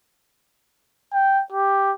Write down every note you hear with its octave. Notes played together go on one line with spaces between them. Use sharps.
G5
G4